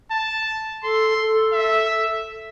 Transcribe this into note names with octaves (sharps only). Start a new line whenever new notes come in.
A5
A4 C6
A4
E5